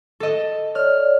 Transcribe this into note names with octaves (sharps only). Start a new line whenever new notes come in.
A4 D#5
C#5 D5 F6